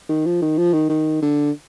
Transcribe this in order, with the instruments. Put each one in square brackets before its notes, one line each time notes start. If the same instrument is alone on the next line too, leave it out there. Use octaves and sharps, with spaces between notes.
[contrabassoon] D#3
F3
D#3
F3
D#3
D#3
D3